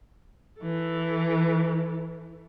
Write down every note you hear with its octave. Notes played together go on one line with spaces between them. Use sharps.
E3 A4